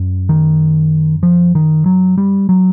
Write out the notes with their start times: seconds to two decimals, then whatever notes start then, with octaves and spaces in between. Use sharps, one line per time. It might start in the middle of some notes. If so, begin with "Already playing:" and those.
Already playing: F#2
0.29 D#3
1.23 F3
1.55 D#3
1.86 F#3
2.18 G3
2.49 F#3